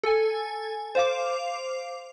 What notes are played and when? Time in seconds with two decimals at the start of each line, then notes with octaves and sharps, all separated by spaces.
0.03 A4 G#5
0.95 C5 F5 D6